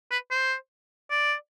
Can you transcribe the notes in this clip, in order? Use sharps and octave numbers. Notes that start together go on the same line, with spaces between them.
B4
C5
D5